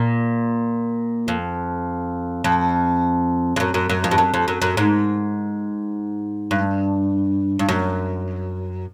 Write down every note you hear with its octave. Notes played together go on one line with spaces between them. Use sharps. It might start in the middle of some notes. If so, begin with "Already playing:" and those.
Already playing: A#2
F2
F2
F2
F#2
F#2
F#2
F2
G2
F#2
F2
F#2
F#2
G#2
G2
G2
F#2